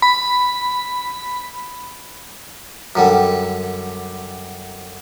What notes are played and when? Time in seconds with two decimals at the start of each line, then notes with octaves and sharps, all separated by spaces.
0.02 B5
2.95 F#2 D3 G3